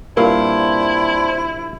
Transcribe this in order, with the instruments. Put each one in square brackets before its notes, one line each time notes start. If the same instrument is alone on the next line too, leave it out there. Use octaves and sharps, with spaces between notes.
[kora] G2 A#2 F5 [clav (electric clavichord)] A#3 [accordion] C4 D4 C5 [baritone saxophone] E4